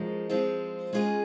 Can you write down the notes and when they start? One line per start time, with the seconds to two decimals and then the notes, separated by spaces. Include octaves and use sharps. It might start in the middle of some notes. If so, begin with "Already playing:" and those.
Already playing: F#2 F3 G#3 D#4
0.29 F3 G#3 C4 F4
0.93 G#3 C#4 F4 G#4 D#5